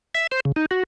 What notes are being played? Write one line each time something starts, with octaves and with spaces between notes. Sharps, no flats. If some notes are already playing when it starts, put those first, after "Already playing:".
E5
C5
C#3
D#4
F#4